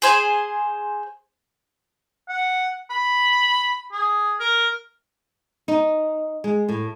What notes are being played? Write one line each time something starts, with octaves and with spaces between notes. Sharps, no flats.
G#4 C5 G#5
F#5
B5
G#4
A#4
D#4
G#3
A2